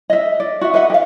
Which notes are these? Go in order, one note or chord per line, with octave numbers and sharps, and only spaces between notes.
D#5 E5
D5
F#4 E5
B4 D#5 E5 F#5
G4 F5